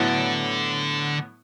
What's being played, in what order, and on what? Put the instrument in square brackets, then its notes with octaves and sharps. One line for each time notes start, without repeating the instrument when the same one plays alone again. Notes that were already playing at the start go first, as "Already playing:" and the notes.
Already playing: [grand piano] A2 F#3 B3 E4 [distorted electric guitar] D3